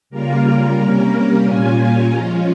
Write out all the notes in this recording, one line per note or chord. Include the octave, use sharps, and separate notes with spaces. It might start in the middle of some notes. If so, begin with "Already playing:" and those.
C#3 G3 A#3 F4 A#4
C3 G3 A#3 C#4 A#4
A#2 G3 A#3 C#4 F4 G#5
F3 G#3 C#4 F4 A#5